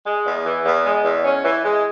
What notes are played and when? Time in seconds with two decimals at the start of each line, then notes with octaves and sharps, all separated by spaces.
0.05 G#3
0.26 E2
0.45 E3
0.65 E2
0.85 G#3
1.04 E2
1.24 C#4
1.44 E3
1.64 G#3